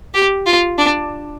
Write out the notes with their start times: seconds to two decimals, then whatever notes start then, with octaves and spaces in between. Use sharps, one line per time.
0.14 G4
0.46 F4
0.78 D4